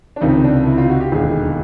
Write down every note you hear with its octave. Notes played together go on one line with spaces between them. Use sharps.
D4
C#2 C3 D#3 D#4
D4
E4
F4
F#4
G4
E1 D#2 D3 G#4